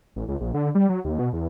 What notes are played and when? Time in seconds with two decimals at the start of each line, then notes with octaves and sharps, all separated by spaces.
0.16 A1
0.28 C#2
0.41 A#1
0.54 D3
0.75 G3
0.89 F#3
1.04 D#2
1.19 B2
1.33 E2